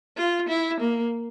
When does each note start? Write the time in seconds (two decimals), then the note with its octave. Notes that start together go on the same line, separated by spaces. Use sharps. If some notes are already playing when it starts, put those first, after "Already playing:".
0.17 F4
0.49 E4
0.81 A#3